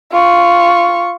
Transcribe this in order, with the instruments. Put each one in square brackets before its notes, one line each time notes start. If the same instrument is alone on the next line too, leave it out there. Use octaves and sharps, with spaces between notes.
[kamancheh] F4 C#6